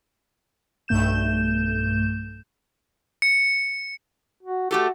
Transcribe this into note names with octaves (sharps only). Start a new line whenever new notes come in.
B1 G2 A3 G6 E7
C#7
F#4
A3 F#4 G4 A4